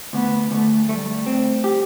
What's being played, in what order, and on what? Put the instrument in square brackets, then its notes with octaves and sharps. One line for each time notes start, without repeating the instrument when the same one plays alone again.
[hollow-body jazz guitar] D2 [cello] B3
[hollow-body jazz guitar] D2 [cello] A3
[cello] G3 [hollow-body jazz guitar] A3
[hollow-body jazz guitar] C4
G4